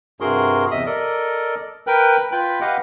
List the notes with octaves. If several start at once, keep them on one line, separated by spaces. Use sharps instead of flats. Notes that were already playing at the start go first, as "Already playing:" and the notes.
G2 C3 F#4 G#4 A#4 C6
E2 C3 D#5 E5 D#6
A4 A#4 D5 D#5
A#4 B4 G5 F#6
F4 B4 G5 B5
G4 B4 D#5 F5 F#5